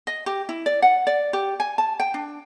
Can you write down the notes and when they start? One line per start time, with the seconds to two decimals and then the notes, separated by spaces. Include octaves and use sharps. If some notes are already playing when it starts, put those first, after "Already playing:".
0.07 D#5
0.26 G4
0.49 E4
0.66 D5
0.82 F#5
1.07 D5
1.33 G4
1.60 G#5
1.78 A5
2.00 G5
2.14 D4